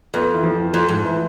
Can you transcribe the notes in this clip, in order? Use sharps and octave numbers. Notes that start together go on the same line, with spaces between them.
F2 B3
E3
F3
F2 F3
G#2
E3